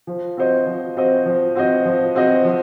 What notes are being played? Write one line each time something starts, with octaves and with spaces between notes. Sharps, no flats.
F3
C4 F#4 C5 D#5
F3
C4 F#4 C5 D#5
F3
C4 F#4 C5 D#5
F3
C4 F#4 C5 D#5
F3